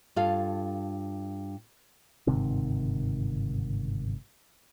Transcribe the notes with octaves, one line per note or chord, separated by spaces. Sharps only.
G2 F4 A4 F5
G1 G#2 C3 D#3